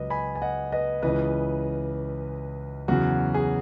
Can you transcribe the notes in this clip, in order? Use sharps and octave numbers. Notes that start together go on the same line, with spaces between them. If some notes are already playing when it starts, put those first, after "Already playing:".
Already playing: C#2 C#3 F#3 B4 D#5
G#5 B5
G#5
D#5 F#5
B4 D#5
C#2 C#3 E3 B4 D#5
E2 C#3 F#3 F#4
G#4